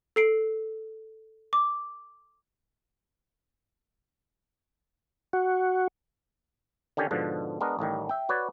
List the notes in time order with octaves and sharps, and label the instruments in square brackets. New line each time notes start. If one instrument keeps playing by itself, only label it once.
[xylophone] A4 C7 D7
D6
[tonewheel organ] F#4
[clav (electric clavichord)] D3 D#3 C#4 G4 C#5 D5
G#2 B2 D3 F3
G#3 B3 D4 A#4
A1 A2 D#3 G3
E5 G5
F#4 B4 C#5 D5